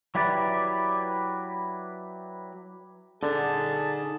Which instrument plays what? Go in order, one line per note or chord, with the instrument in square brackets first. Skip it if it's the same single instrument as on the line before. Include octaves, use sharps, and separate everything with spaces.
[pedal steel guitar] F#3 E4 G4 B4 D5
[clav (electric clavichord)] D3 [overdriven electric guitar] D#4 F#5 [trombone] G#4 [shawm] A5